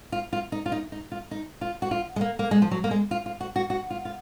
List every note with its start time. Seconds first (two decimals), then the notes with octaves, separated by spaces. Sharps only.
0.12 F4
0.33 F4
0.52 D#4
0.66 F4
0.72 D#4
0.92 D#4
1.12 F4
1.31 D#4
1.61 F4
1.82 F#4
1.91 F4
2.16 G#3
2.21 A#3
2.39 A#3
2.51 G#3
2.62 F3
2.71 F#3
2.84 A#3
2.91 G#3
3.11 F4
3.26 F4
3.41 F#4
3.56 F#4
3.70 F#4
3.90 F4
4.05 F4